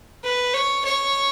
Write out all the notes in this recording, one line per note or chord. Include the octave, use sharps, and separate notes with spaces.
B4
C#5
C#5